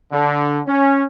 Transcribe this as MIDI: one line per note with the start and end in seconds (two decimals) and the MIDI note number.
0.12 0.59 50
0.67 1.03 61